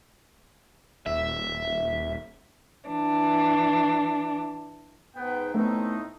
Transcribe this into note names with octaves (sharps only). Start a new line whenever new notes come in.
D#1 E5
E3 D4
G#2 B3 G5
A2 A3 B3 C4 D#4